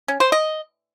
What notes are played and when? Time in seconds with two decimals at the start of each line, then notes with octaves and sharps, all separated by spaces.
0.08 C#4
0.20 C5
0.32 D#5